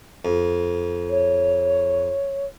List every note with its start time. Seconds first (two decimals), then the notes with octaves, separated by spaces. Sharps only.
0.25 F2
1.10 C#5